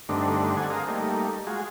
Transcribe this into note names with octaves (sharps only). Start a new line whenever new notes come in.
G2 D3 A3 C4 D4 D#4
A4 F#5 G#5
G#4 A#4 C5 F5 D#6
G3 A3 A#3 D#4
G#3 F4 F#4 G#4